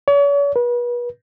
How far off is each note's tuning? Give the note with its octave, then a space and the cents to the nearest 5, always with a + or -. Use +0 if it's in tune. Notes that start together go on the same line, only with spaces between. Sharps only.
C#5 +40
B4 -35